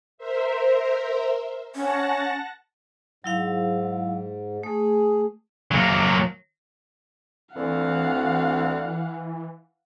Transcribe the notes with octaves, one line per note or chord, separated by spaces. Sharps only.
A#4 C5 E5
C#4 F#5 A5 A#6
G#2 F#3 E4 F5
A3 G#4
F#3 A#3
D2 E3 C4 F5 F#5